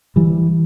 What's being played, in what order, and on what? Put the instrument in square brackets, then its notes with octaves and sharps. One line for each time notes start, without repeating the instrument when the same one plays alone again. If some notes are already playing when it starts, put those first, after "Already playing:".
[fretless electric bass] E3 G3